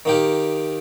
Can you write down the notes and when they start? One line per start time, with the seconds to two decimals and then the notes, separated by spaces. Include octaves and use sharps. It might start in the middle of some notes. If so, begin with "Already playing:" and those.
0.05 D#3 A#3 G4